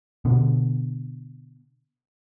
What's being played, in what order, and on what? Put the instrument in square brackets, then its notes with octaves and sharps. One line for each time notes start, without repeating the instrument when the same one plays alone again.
[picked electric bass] B2 D3